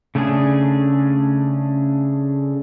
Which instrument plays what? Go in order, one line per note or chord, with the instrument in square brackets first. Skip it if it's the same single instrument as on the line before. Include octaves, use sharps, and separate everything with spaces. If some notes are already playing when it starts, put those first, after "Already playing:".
[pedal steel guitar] C#3 A3 C#4 D4 G#4